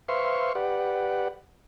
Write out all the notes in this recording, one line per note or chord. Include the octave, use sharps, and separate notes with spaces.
B4 C5 E5 F5 C6 C#6
G4 B4 D5 F#5